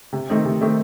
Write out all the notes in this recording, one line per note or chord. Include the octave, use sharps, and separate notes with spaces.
C3
D#3 A3 C4 D#4
C3
D#3 A3 C4 D#4